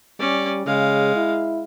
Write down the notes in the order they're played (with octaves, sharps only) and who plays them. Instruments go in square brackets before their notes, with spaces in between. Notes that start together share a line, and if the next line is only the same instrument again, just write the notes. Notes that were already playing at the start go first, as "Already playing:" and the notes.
[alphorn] G3 [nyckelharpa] C#4 D5
[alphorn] C#3 [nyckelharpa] G#3 F5
[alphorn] E4